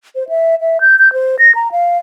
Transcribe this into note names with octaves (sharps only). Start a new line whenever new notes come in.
C5
E5
E5
G6
G6
C5
A#6
A#5
F5